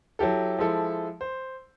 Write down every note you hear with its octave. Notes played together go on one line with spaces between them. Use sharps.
F#3 E4 G4 A4
F3 G#3 E4 A4
C5